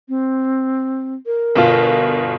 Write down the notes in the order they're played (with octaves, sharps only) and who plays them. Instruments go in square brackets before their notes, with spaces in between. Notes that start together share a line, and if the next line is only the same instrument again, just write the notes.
[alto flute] C4
A#4
[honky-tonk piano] G1 B2 F4